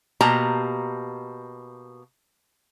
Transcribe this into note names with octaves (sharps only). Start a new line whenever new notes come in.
B2 A#3 G4 A5 A#5